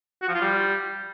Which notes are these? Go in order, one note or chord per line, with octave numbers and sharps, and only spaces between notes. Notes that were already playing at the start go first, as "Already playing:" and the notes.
F#4
F3
F4
G3